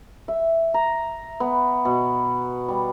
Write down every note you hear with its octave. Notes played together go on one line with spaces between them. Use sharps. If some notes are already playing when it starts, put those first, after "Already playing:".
E5
A#5
B3
B2
G3